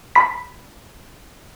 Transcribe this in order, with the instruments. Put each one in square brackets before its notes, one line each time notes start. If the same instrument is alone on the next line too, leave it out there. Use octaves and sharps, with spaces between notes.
[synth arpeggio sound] B5 B6